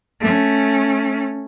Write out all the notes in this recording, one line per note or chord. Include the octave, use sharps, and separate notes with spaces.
A3 C#4